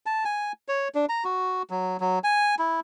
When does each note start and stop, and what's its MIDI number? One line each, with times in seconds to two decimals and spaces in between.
0.06 0.24 81
0.25 0.52 80
0.68 0.88 73
0.95 1.06 62
1.09 1.24 82
1.24 1.62 66
1.70 1.97 54
2.00 2.19 54
2.24 2.55 80
2.59 2.80 64